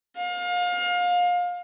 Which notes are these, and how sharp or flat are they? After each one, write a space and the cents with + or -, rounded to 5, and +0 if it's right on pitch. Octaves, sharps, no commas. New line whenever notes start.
F5 +30